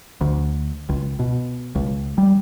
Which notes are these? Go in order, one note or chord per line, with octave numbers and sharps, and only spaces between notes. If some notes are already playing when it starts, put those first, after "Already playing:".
D2
C#2
B2
C#2
G3